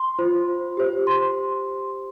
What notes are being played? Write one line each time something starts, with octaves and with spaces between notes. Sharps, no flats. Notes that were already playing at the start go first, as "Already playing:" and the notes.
Already playing: C6
F4 C5
G4 C5
C6